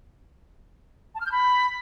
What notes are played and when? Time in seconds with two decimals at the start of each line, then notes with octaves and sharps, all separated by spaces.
1.15 A5
1.20 F6
1.26 G6
1.32 B5